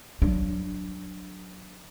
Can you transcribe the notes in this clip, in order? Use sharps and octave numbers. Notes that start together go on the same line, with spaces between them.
F#3 D4